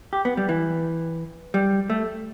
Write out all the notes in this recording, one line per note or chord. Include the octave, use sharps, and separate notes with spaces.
G4
B3
G3
E3
G3
A3